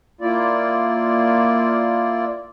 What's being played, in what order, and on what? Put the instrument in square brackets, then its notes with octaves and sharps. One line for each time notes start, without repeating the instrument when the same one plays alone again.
[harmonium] A#3 E4 F4 D5